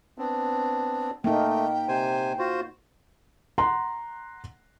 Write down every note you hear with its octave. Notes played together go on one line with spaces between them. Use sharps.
B3 C4 D4
A3 A#3 D#4 G5
C3 C5 G#5
F4 F#4 C5
F#5 A#5 C6